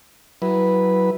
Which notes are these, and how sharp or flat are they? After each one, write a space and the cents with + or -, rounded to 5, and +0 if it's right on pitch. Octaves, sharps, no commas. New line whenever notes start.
F#3 +20 E4 +0 B4 -5